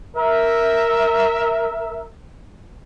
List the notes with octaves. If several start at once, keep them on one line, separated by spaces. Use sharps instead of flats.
A#4 E5